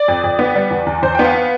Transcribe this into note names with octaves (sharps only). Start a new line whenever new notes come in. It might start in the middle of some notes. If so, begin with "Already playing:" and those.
Already playing: D5
F2
F2
B3
G3
E2
E2
E2 C5
B3 G5
F5